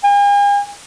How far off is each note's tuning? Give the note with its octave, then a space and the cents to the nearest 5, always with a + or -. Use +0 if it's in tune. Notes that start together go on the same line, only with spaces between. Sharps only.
G#5 -45